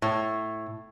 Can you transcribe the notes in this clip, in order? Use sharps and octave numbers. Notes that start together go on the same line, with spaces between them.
A2